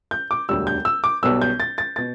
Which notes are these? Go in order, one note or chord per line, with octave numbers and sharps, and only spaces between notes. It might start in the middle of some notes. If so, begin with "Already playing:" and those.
G6
D6
E1 D2 D3 G3 E6
G6
E6
D6
B1 B2 G3 E6
G6
A6
A6
B2 A6